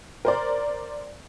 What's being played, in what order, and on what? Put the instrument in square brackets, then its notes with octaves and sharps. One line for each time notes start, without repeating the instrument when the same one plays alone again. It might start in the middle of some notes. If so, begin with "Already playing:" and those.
[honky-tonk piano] A#4 C5 D5